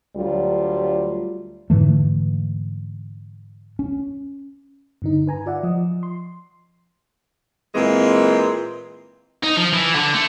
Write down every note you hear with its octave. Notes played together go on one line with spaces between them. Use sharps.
D2 F#3 G3 F4
G#2 D3 E3 A3
C#4
G2 D3 D#4
B4 G#5 A#5
F4 D5 E5 F#5
F3 D#5
C6
A#2 E3 G#3 C4
D#4
F3
E3
D3
A3